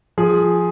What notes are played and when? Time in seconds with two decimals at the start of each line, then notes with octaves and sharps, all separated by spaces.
0.18 F3 G#4